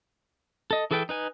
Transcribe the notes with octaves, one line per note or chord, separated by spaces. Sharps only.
A4 D#5
E3 G#4 A4 B4 G5
D#4 B4 G#5